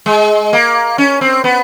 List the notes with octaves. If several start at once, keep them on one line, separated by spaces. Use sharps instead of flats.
G#3
A#3
C#4
C4
B3